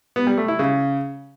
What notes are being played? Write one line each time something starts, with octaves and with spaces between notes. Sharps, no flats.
B3
G3
A3
E4
C#3